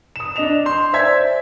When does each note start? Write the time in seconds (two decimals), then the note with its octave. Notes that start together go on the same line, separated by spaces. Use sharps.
0.16 D#6 E7
0.36 D4 D#5 E7 F7
0.66 C6 G6
0.93 C5 D5 E5 G#5 G#6 B6